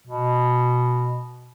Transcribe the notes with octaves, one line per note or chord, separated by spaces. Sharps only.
B2